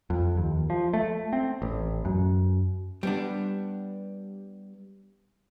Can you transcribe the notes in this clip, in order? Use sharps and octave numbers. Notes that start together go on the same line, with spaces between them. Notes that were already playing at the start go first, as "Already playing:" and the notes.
F2
D#2
F3
A3
C4
A1
F#2
G3 B3 D4